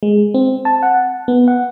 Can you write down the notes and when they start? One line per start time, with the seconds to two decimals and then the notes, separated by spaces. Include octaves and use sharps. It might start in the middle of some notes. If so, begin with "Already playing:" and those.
0.03 G#3
0.34 C4
0.65 A5
0.83 F#5
1.28 B3
1.48 F#5